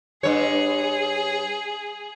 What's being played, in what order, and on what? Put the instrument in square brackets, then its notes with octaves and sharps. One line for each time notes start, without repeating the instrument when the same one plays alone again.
[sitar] G2 C#5 [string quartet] G#4